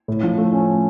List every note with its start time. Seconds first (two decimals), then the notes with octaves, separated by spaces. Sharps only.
0.08 A2
0.23 F3
0.38 A3
0.53 C#4